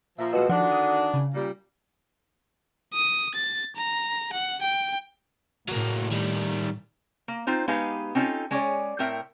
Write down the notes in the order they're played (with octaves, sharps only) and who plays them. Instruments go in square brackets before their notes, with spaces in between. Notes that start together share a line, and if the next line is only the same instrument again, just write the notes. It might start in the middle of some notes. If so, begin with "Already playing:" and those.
[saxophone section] A#2 F3 [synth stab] E5 A#5
[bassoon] B2 [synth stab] G#3 F#4 E6
[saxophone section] D3 D#3 D4 [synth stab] F3 [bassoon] F#4
[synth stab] D#6
C#3
[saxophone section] A#2 G3
[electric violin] D#6
A6
A#5
F#5
G5
[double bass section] A2 [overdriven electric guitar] F#3 A#3
[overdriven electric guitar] D#3 G3
[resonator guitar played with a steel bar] A#3
C4 D#4 F4 C5
G#3 B3 D#4 G4 B4 F5
C4 C#4 D#4 F4 A4
G#3 C#4 G#4 C#5 D5
A2 C4 A#4 E5 G5